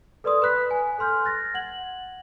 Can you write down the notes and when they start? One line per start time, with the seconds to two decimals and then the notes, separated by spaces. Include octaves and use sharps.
0.24 A4 B4 D5 C6 D#6
0.42 B4 B5 F#6 B6
0.71 G#5
0.98 A4 G#5 C6 F6 G6
1.25 F#6 A6 A#6
1.54 F#5 G#6 F#7